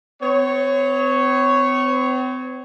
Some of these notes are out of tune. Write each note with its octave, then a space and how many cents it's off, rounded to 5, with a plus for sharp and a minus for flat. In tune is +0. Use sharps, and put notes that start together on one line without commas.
C4 -45 C#5 +0